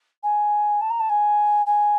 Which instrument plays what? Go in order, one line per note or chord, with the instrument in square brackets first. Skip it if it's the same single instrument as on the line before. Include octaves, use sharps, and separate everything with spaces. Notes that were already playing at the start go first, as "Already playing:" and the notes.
[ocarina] G#5
A5
A#5
A5
G#5
G#5